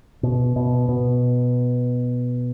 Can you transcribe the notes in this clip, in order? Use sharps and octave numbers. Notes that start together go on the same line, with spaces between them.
B2
B2
B2